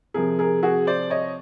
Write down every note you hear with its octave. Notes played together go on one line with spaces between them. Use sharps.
C3 F3 G#4 A#4
G#4 A#4
F#4 G#4
C5 D5
C#5 D#5